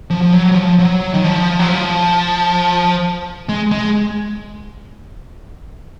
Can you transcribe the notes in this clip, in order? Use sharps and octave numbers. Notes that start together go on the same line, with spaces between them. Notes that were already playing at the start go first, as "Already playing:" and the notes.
F3
F3
F#3
F#3
F3
F#3
D#3
F3
F#3
F3
G#3
G#3